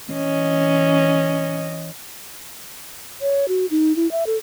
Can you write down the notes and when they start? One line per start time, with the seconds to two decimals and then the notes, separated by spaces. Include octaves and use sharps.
0.11 E3 C#4 D#5
3.21 C#5
3.48 F#4
3.71 D#4
3.96 E4
4.12 E5
4.27 A4